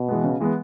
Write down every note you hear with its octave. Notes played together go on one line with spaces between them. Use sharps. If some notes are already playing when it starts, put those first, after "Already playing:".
Already playing: B2
E3 G#3 B3
C#3
E3 G#3 B3